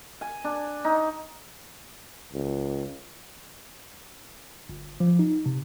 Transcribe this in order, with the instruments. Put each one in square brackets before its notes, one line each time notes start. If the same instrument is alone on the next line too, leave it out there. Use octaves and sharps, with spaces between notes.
[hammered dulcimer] G#5
D4
D#4
[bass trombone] C#2
[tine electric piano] G1
F3
D#4
C3